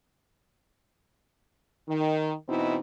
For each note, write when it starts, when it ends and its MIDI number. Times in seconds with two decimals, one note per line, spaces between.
1.88 2.32 51
2.48 2.78 47
2.48 2.78 52
2.48 2.78 60
2.48 2.78 63
2.48 2.78 64